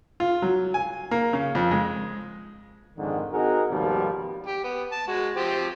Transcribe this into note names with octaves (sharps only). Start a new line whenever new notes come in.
F4
F#3
G#5
A#3
C#3
F2
G#3
F2 G#2 D3 D#3
C4 D#4 F#4 G#4 A#4
G#1 D#2 B2 F3 G3
G4
B3
A5
G#3 F#4
F3 C4 G4